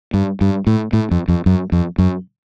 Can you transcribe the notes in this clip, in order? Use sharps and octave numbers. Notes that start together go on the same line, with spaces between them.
G2
G2
A2
A2
F2
F2
F#2
F2
F#2